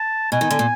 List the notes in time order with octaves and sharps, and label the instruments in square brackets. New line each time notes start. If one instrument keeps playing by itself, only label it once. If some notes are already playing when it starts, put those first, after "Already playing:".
Already playing: [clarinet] A5
[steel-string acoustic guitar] B2 [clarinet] G#5
[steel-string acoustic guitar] D#3
D3
A#2